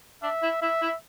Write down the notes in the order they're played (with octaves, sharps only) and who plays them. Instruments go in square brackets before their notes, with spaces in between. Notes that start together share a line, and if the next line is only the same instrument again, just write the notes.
[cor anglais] D4 [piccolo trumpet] E5
[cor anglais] E4
[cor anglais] E4 [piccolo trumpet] E5
[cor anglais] E4